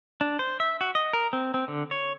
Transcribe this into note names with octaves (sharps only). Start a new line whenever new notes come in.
D4
C5
E5
F#4
D#5
A#4
C4
C4
D3
C#5